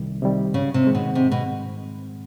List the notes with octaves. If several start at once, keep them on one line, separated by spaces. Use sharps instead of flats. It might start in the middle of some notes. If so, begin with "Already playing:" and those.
Already playing: C2 C3 D#3 G3
C3 D#3 G3
G#2 C#3
C3
D#3 G#3 C4
B2
G#2 C3
B2